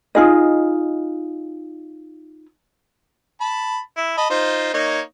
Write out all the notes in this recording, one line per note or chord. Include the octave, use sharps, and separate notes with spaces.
D#4 F4 G#4 D#5
A5 B5
E4
D#5 A5 B5
D#4 F4 C5
A#3 D#4 C#5